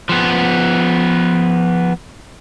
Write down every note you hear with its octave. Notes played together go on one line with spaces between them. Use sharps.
F3 B3